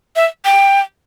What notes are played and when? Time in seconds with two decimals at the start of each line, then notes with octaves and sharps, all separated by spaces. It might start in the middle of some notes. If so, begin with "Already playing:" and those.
0.16 E5
0.45 G5